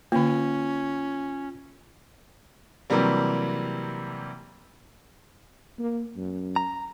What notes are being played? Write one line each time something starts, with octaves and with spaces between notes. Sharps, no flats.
D3 A#3 C#4 F4
C3 E3 F#3 G3 A#3
A#3
F#2
A#5